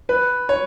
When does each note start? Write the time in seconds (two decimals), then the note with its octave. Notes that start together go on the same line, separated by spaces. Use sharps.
0.09 B4
0.49 C#5